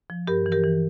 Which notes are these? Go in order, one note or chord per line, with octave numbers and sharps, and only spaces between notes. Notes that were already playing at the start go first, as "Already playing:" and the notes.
F3
G2 G4 A#4
E3
G4 A#4
E3